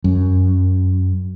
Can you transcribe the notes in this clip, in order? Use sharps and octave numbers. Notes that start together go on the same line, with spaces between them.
F#2